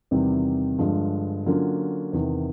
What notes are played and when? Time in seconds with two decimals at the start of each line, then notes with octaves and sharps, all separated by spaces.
0.11 E2 C3 D#3 G3 C4
0.79 G2 D3 F3 G#3
1.46 D3 F#3 A#3 C#4 F4
2.13 E2 C3 D#3